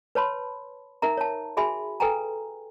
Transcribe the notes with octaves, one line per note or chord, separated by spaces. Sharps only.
B4 C#5 A5 B5 C6
D#4 A#4 E5 A#5
C#5 A5
F#4 G#4 E5 G#5 B5
A4 B4 G5 G#5 A#5